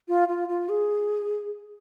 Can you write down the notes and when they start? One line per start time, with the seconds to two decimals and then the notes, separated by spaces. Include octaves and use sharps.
0.08 F4
0.28 F4
0.49 F4
0.69 G#4